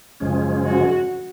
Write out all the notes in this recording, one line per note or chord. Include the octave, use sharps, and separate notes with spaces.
F#2 C#3 F3 G#3 C#4
F#4